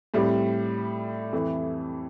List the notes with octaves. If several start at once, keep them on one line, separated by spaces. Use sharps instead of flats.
A2 G3 C4 G4
F2 E3 A3 E4